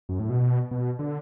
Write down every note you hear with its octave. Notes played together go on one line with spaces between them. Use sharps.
F#2
A2
B2
B2
D3